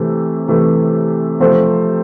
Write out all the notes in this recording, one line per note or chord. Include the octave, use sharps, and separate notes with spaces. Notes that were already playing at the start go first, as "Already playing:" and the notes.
Already playing: C3 E3 A3
C3 E3 A3
C3 F3 A3 C4